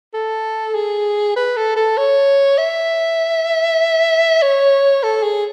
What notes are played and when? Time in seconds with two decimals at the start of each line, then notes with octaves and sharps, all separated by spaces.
0.14 A4
0.75 G#4
1.36 B4
1.56 A4
1.76 A4
1.97 C#5
2.58 E5
4.42 C#5
5.03 A4
5.23 G#4